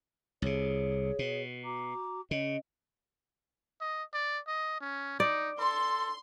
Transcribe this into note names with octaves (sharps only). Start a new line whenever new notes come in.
C2 C3 G#4 C#5
B2
F#4 A#5 D6
C#3 C#4 D#5
D#5
D5
D#5
C#4
D#4 D5
A4 C6